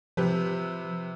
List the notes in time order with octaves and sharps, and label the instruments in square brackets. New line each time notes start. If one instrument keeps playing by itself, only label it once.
[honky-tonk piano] C3 G4 B4 [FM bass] F3